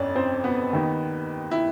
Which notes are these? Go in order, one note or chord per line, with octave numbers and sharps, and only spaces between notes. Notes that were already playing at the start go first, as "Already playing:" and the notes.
Already playing: G1 F2 C#4 C#5 D5
C4 C5
B3 B4
D#2 D#3
E4